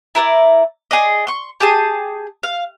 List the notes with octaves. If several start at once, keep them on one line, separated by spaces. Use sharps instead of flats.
E4 A#4 C5 D5
G#4 D5 D#5
C6 C#6
G4 G#4 A5 D#6
F5